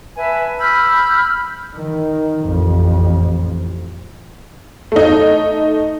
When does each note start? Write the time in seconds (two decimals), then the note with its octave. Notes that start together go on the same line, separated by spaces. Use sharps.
0.16 B4 E5 G#5 A5
0.59 B5 E6 F6 G6
1.75 D#3
2.44 A1 F2
4.92 A3 D#4